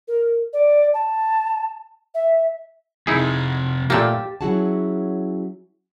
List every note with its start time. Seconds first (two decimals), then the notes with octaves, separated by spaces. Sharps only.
0.08 A#4
0.53 D5
0.94 A5
2.14 E5
3.07 F2 C3 D#4 E4 G#4
3.90 A#2 A3 A#3 G4 A5
4.41 F#3 C#4 E4 F#4 G#4 A5